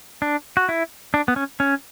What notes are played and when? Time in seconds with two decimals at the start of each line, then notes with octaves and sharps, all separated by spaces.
0.22 D4
0.57 F#4
0.69 E4
1.14 D4
1.28 B3
1.36 C#4
1.60 C#4